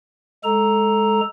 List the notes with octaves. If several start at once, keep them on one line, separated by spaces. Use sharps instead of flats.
G#3 A4 A#5